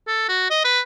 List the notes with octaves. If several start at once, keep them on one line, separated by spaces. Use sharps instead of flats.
A4
F#4
D#5
B4